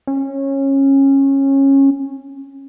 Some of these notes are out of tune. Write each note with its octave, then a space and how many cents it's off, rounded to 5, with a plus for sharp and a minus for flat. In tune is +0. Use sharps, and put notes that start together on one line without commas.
C#4 -20